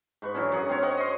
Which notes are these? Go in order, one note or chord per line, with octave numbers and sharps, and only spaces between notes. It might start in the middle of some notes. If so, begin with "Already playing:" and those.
G#2 B4 C#6
D3 E3 F#3 C#4
F#2 F#3 G#4 F#5
C4 C#4 F#4 C#5
C#5 D#5 F#5 C#6
D#5 C6